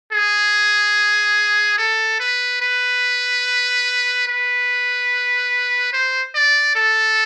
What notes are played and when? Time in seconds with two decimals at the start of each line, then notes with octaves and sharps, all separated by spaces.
0.12 G#4
1.78 A4
2.20 B4
2.61 B4
4.27 B4
5.93 C5
6.35 D5
6.75 A4